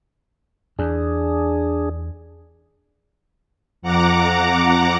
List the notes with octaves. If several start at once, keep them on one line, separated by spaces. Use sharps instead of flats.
E2 D4 G#4
F2 F#5 A#5 D6